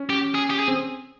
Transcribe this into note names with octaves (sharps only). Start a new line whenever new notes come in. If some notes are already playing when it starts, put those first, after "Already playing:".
Already playing: C#4
G4
G#4
G4
G#4
C4